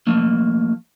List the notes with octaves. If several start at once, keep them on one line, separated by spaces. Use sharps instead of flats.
F3 A3 A#3